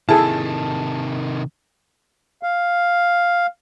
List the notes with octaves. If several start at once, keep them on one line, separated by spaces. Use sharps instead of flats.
C3 D#3 E4 G#4 A4 A5
F5